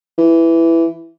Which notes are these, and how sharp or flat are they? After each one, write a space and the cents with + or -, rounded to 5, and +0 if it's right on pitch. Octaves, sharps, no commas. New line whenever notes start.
E3 +5